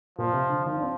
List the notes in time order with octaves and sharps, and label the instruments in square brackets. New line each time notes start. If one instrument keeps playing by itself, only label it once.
[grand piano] A#2 [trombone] F3
[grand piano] C3
D3
[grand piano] D#3 [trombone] F3
[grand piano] D4
C4